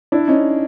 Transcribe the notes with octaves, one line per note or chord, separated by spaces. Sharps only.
D4 E4
C#4 D#4